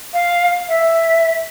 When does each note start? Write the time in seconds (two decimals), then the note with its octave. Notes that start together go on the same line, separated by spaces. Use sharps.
0.14 F5
0.69 E5